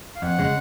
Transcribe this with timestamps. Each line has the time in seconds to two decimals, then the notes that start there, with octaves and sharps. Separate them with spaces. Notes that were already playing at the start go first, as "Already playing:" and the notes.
0.16 F5
0.22 F2 F#5
0.38 C#3 G#3